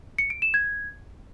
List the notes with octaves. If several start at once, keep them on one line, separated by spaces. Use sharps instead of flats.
C#7
D7
E7
G#6